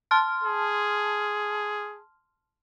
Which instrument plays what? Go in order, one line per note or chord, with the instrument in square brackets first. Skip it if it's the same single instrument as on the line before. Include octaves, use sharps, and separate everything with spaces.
[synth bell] A5 C6 F6
[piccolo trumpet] G#4